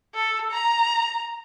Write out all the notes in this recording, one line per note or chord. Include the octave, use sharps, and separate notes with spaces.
A4
A#5